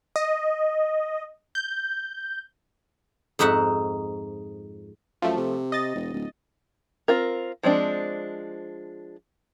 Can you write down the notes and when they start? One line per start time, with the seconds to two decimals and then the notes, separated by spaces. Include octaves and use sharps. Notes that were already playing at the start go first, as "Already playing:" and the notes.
0.16 D#5
1.55 G6
3.39 F2 G#2 D#4 E5 F#5
5.22 F#2 F3 A3
5.37 C3
5.72 D#5 A6
5.95 E1
6.13 D1
7.08 C4 F4 A#4
7.63 F3 G#3 C4 D4